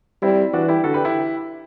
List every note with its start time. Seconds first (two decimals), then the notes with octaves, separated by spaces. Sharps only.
0.22 G3 C4 E4
0.53 E3 D4 F#4
0.68 E4 G4
0.83 D3 F#4 A4
0.94 G4 B4
1.04 E4 G4